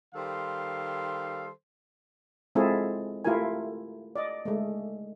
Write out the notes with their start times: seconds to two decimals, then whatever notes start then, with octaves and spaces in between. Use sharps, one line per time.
0.15 D#3 G3 A4 C5 F5 C6
2.55 G#3 C4 E4 F4 G#4 A4
3.25 A3 E4 F4 G4 A#4 G#5
4.16 D5 D#5
4.45 G#3 A3